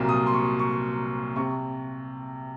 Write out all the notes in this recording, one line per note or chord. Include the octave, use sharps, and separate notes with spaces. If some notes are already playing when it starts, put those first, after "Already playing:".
Already playing: C2 A#2 F#3 A#3
D#6
C6
C#6
C#6
C3 C#6